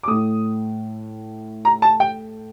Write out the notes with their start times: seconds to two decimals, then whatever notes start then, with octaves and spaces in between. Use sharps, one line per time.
0.03 D6
0.07 A2 A3 D#6
1.65 A#5
1.82 A5
2.00 G5